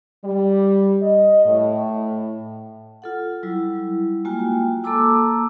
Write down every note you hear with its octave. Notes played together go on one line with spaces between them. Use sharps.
G3
D#5
A2
F4 A4 F#5
F#3 G3 E4
G#3 A#3 F4 F#4 G5 G#5
A#3 A4 A5 A#5 D6 E6